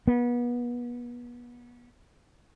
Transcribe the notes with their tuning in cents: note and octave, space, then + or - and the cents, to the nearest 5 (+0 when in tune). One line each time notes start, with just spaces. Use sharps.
B3 -30